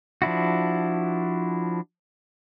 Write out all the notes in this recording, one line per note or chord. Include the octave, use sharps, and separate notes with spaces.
F3 D4 E4 F#4